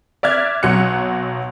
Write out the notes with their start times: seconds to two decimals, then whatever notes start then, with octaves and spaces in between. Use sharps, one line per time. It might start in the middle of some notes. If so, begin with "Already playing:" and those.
0.23 D5 E5 F6 F#6 G#6
0.63 B1 F#3 F#6 C#7